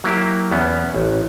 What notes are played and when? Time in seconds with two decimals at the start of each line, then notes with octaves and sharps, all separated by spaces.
0.04 F#3 A#3 E4 G4
0.51 E2 B3 C#4
0.94 A1